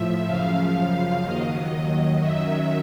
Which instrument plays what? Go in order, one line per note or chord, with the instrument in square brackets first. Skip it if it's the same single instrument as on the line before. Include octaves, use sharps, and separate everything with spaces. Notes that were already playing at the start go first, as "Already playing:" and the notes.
Already playing: [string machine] A2 F3 E5
F#2 C#3 F3 F5
D#2 D#3 F#3 D#5
F#2 D#3 F#3 E5